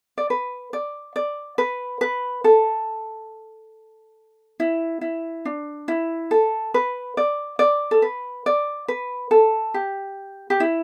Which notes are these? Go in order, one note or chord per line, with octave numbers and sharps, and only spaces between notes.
D5
B4
D5
D5
B4
B4
A4
E4
E4
D4
E4
A4
B4
D5
D5
A4
B4
D5
B4
A4
G4
G4
E4